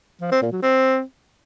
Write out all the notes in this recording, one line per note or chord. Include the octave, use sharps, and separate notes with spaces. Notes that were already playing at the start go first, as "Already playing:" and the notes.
F3
C4
A#2
F#3
C4